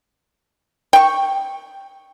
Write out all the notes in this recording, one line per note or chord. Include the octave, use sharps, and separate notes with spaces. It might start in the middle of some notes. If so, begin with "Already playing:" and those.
G5 C#6